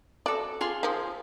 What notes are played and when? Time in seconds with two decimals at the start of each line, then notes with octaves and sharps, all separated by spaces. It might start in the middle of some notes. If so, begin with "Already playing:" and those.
0.26 F#4 A4 D5
0.61 F4 G#4 C6
0.83 D#3 F3